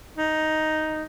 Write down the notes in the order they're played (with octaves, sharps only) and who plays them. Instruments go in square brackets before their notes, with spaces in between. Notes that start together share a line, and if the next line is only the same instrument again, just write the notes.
[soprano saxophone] D#4